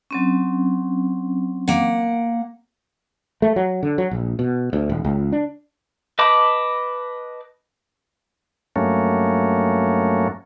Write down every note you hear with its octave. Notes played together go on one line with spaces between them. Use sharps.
F#3 C4 C#4
A#3 F#5
A3
F#3
D3
F#3
A#1
B2
D2
D#1
C#2
D4
B4 D#5 A5 B5 D6
G2 F#3 A3 A#3 C#4